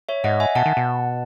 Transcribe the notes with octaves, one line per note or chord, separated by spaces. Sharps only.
C#5 E5
G#2 D#5 F#5
E5 G#5
B2 F#5 A5
D#3
B2